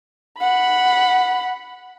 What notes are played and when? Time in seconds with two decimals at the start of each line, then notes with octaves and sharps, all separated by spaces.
0.39 F#5 B5